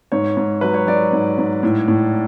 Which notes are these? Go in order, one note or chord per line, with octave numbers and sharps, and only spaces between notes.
G#2 C#5
G#2
F#3 B4
C#5
F#3 D5
G#2
G#2
A2
A2